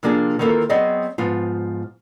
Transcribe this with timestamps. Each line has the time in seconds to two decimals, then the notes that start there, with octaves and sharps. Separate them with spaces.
0.03 C3 F3 A#3 D4 F4 G#4
0.39 D#3 E3 A#3 D4 F4 A4
0.69 F#3 B3 C4 G#4 D5 D#5
1.18 G#2 F3 B3 F4